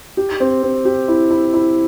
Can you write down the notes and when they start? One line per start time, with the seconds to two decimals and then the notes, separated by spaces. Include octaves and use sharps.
0.17 G4
0.40 C4
0.63 C4
0.85 G4
1.08 E4
1.31 E4
1.54 E4